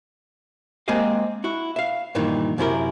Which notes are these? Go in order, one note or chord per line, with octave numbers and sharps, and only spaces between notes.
G#3 A#3 C4 G4 D#5 F5
E4 F#4
E5 F5
G2 A#2 D#3 E3
F#2 C3 E4 A#4